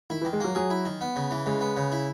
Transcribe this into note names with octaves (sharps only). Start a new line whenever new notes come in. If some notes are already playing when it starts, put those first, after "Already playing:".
D#3 E4
E3
D#3
G#3
F#3 A#3
F#3 G#4
E4
D#3
B3
C#3
E3
C#3 G#3
B3
C#3
E4